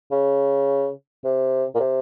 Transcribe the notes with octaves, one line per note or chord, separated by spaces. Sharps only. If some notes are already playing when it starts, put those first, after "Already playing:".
C#3
C3
A#2
C3